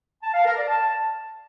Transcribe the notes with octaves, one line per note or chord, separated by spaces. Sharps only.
A5
F5
A#4
D5
A5